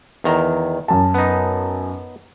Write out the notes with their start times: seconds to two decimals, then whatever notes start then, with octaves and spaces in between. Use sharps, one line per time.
0.24 E2 D#3 A#5
0.88 F#2 A5
1.14 B3 D#4